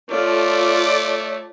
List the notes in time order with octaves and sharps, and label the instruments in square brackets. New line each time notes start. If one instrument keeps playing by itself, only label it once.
[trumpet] A3 [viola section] F4 A4 [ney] C#5 [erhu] D5